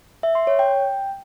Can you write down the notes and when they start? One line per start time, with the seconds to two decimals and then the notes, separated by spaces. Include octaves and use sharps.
0.23 E5
0.35 C6
0.47 C#5
0.59 G5